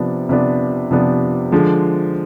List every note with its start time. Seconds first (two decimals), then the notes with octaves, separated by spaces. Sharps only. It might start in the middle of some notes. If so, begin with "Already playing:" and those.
Already playing: C3 F3 B3 D4
0.29 C3 F3 B3 D4
0.91 C3 F3 B3 D4
1.52 D3 F3 G#3